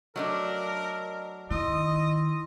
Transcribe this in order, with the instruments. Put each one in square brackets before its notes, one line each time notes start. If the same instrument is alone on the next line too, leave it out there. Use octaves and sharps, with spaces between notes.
[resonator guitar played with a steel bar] F#3 A3 D4 [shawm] A#4 [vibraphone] D#5
[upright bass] D#3 [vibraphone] E4 C6 D#6 [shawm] D#5